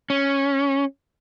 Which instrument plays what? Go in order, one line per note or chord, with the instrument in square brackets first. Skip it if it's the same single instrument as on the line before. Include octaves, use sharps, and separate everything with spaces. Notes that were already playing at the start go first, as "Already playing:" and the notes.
[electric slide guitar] C#4